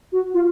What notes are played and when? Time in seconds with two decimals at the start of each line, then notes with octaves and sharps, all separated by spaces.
0.12 F#4
0.34 F4